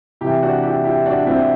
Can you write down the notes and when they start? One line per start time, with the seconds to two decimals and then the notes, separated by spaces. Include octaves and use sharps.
0.21 C3 E3 E4 G4
0.42 D4 F#4
0.63 E4 G4
0.84 E4 G4
1.06 D4 F#4
1.26 C4 E4